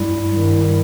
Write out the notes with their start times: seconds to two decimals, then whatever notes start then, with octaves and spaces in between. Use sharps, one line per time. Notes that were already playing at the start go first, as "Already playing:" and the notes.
Already playing: G2 G3 E4
0.34 G2 D#3 G3